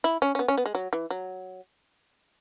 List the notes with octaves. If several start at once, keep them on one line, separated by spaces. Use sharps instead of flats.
E4
C#4
C#4
B3
C#4
B3
G#3
F#3
E3
F#3